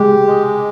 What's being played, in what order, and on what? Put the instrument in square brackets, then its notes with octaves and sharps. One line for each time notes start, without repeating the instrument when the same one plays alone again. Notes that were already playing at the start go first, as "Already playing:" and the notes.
Already playing: [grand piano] G#3 [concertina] G4
[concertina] G#3